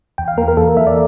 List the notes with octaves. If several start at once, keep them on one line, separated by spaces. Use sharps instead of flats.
E2 G5
F5
E3 A#3 A#4
A#4
E2 A4
A#4
E3 A#3 E5
D5